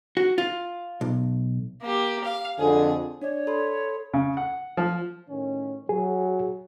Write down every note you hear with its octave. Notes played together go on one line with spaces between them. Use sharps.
F#4
F4
B1
A#3 G4
F5
F2 D3 G#4
D4 C#5 D5
A4 B5 C6
C#3
F#5
F3
A2 D#3 C#4
F#3 G#4